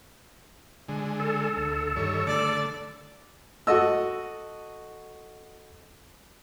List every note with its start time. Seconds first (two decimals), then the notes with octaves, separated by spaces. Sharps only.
0.88 D3 G#3
1.20 A4
1.57 D2
1.96 G2 D#3 C#5
2.27 D3 A3 D5
3.67 F#4 A4 D#5 E6